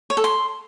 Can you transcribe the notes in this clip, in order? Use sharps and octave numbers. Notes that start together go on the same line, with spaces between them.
C#5
A4
C6